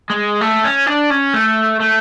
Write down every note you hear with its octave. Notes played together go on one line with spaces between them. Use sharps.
G#3
A3
C#4
D4
C#4
A3
A3